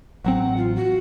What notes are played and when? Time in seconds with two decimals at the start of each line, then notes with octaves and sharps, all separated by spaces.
0.24 A1 F#3 C4 F#5
0.57 F4
0.76 F#4